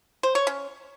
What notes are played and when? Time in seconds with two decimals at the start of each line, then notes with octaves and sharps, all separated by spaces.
0.23 C5
0.35 C#5
0.47 C#4